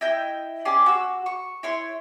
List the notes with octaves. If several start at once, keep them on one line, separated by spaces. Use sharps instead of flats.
E4 D#5 G5 G6
C#4 G4 D5 C6
F#4 E6
C#6
E4 C#5 C6